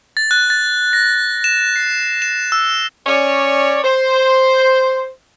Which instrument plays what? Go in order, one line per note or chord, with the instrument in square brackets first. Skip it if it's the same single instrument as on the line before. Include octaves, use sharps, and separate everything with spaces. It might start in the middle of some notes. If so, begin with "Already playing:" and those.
[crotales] A6
F#6
A6
A#6
E7
C7
E7
E6
[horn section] C#4 C#5 D5
C5